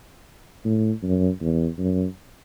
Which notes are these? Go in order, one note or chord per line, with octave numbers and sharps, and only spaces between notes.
A2
F#2
E2
F#2